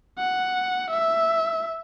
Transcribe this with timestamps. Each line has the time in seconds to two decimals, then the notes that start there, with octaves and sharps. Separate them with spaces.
0.18 F#5
0.91 E5